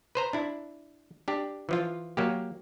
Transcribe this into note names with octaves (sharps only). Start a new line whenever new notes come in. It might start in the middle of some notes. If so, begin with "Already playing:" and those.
B4 C5 A#5
D4 E4
D4 G4
E3 F3 F4
F#3 A#3 G4